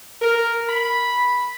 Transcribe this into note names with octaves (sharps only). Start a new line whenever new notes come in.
A#4
B5